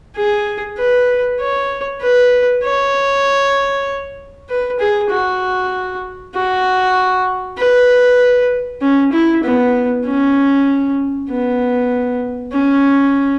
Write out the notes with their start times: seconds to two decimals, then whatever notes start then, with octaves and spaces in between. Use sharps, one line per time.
0.16 G#4
0.78 B4
1.39 C#5
2.01 B4
2.63 C#5
4.49 B4
4.79 G#4
5.10 F#4
6.34 F#4
7.57 B4
8.81 C#4
9.12 E4
9.43 B3
10.05 C#4
11.29 B3
12.52 C#4